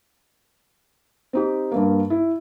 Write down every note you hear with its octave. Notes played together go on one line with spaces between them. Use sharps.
C4 D#4 G4
G2 A#3
E4